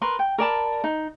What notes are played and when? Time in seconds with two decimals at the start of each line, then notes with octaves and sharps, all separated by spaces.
0.02 A#4 B4 C6
0.19 G5
0.38 A#4 D5 A5 B5
0.84 D#4